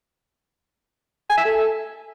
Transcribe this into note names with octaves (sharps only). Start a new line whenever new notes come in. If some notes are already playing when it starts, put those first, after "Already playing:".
G#5
E5
A4